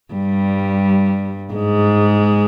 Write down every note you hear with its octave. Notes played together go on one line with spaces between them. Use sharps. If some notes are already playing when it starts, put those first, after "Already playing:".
G2 G3
G#2 G#3